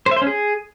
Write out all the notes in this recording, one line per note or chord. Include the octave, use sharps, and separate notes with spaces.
C5
E5
C5
C#4
G#4